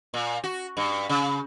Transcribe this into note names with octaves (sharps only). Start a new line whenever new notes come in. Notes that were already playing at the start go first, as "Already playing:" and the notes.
A#2
F#4
G2
C#3